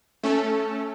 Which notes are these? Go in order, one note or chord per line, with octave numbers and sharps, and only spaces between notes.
A3 C#4 A4